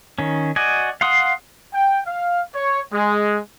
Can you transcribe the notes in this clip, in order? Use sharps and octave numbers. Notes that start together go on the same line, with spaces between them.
D#3 C#4
F#4 D5 D#5 G#5
F5 F#5 C6 D#6
G5
F5
C#5
G#3